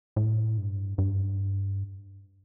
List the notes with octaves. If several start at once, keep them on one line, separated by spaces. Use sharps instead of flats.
A2
G2
G2